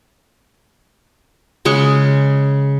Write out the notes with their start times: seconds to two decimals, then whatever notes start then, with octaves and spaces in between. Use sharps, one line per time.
1.65 C#3 G#3 B4 C#6